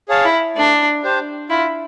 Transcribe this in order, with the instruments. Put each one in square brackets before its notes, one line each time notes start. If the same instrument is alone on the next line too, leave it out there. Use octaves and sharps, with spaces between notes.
[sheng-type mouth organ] G#4 C#5 F5 A5
[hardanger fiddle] E4
[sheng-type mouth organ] A3 [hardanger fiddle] D4
[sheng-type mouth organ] D4 G4 C5
[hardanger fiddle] E4 [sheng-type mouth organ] F4